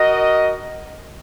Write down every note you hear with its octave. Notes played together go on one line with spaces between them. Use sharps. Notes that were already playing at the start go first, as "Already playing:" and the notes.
Already playing: F#4 A#4 D#5